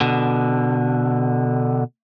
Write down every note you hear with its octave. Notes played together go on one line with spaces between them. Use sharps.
B2 D3